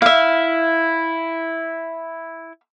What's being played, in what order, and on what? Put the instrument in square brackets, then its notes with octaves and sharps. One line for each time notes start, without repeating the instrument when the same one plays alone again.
[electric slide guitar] E4 [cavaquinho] E5 F5